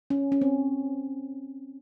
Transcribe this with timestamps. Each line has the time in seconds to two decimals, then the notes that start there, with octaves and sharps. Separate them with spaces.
0.10 C#4
0.32 C#4
0.41 C4